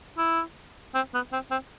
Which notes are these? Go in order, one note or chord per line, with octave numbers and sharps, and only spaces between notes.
E4
C4
B3
C4
C4